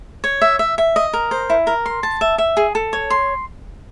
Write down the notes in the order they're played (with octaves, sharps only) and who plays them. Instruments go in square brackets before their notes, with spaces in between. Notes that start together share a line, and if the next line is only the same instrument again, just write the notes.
[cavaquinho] C#5
E5
E5
E5
D#5
A#4
C5
E4
A#4
C6
A5
E5
E5
G#4
A4
C#5
C6